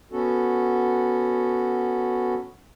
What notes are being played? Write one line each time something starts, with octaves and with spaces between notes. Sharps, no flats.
B3 C#4 F#4 A4